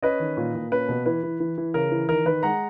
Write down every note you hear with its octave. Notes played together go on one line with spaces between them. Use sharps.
C#4 B4 D#5
D#3
A#2
A#2
C#4 B4
B2
E3 B4
E3
E3
E3
C#3 A#4
E3
D#3 A#4
D#3 B4
G#3 F#5 A#5